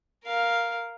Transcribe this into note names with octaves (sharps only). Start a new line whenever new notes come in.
A#4 F5